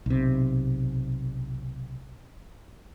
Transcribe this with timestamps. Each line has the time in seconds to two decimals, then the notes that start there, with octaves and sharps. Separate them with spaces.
0.06 B1 C3